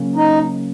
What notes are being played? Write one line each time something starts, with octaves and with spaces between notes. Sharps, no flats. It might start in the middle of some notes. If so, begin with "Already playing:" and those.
Already playing: C#3 F#3 A#3 C#4
D#4